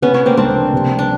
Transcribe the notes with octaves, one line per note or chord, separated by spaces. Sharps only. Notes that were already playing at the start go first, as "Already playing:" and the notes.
C3 B3 C#4
B3 C#4
A3
A#3 C4
C#2 C4 D4
F3
C3
G3
D4